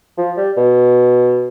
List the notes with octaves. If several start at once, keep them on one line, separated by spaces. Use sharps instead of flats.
F3
G3
B2